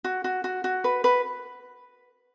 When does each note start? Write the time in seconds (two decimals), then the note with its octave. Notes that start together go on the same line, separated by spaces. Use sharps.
0.04 F#4
0.24 F#4
0.44 F#4
0.64 F#4
0.84 B4
1.04 B4